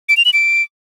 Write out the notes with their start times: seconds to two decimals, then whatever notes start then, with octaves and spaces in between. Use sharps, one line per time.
0.09 D7
0.17 F7
0.25 F#7
0.33 D7